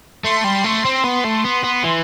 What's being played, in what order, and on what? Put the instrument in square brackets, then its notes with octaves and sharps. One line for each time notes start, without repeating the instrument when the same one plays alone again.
[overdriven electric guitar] A3 [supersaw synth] C6
[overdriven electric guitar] G3
A3
C4
B3
A3
B3
B3
E3